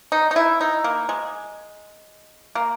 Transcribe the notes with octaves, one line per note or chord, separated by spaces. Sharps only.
D#4
D#4
E4
D#4
A#3
G#3
A#3